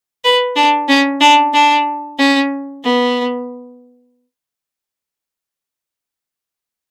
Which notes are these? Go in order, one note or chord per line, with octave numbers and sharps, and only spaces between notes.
B4
D4
C#4
D4
D4
C#4
B3